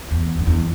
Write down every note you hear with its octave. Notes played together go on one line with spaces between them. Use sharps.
E2
F#2
E2